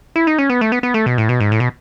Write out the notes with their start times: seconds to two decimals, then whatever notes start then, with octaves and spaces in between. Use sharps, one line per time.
0.16 E4
0.27 D#4
0.38 C#4
0.50 B3
0.61 A3
0.72 B3
0.83 B3
0.94 A3
1.06 B2
1.18 A2
1.29 B2
1.40 G#2
1.52 A2
1.60 B2